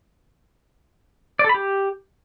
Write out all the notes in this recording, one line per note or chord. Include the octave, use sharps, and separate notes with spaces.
D5
A4
B5
G4